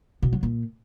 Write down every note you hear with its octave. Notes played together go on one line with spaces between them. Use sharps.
B2
F#3
A#2